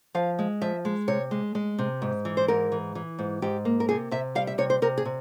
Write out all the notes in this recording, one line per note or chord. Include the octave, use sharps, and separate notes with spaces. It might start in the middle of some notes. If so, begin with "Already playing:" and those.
F3 F5
G#3
F3 E5
G#3
C3 C#5
G#3
G#3
C3
G#2
E3
C5
G#2 A#4
E3
E3
G#2
G#2 G4
A#3
A#4
C3 G#4
C3 E5
G3 F5
E5
C3 C#5
C5
C3 A#4
G#4
C3